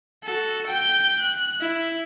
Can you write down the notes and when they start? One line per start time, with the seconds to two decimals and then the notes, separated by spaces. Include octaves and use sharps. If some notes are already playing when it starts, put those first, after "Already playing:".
0.23 F#4 A4
0.67 G5 G6
1.19 F#6
1.61 E4